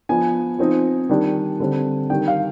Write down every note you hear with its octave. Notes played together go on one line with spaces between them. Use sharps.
F3 B3 D4 G#5
F3 C4 D#4
D#3 G3 D4
D3 G3 C4
D#3 G3 D4 G5
F5